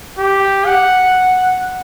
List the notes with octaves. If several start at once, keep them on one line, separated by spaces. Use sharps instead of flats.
G4
F#5